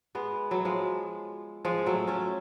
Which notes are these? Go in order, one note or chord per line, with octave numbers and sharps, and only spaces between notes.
G#3 B3
F#3 A3
F3 G#3
F3 G#3
F#3 A3
A3 C#4